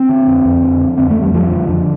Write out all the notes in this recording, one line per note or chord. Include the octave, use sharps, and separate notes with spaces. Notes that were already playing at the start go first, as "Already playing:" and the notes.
Already playing: C4
D3
F2
F2
D3
D3
F2 C4
A3
F2
G3
D3 F3
D3
F2 D3